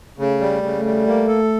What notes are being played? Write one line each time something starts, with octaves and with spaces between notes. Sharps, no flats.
C#3 A3
G3
A3
C#3
A3
G3
A#3
A4